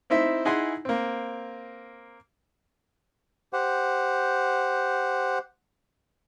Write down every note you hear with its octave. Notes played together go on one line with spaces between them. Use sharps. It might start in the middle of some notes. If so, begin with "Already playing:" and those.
C4 D#4 E4 C5 E5
D#4 E4 G#4 F#5 G#5 C6
A#3 C4
G4 C5 F#5